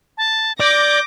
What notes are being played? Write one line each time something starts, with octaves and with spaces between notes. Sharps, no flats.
A5
D5 D6 G6 A#6